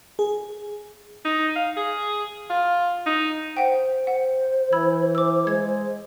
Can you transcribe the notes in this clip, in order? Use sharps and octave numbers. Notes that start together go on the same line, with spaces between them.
G#4
D#4
F5
G#4
F4
D#4
C5 F#5 G5
F#5
E3 B5 E6 G#6
D6 E6
G#3 G#6